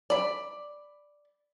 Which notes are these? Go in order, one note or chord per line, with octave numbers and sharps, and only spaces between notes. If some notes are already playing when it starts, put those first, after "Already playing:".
D5 B5